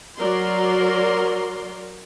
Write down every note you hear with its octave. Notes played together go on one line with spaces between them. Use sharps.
F#3 A#4 D5 C6